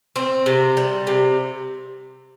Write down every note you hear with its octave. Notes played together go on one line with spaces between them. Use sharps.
C4
C3
G3
C3